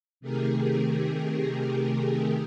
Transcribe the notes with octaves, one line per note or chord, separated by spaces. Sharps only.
C3 D#3 A3 G4 G#4 A#4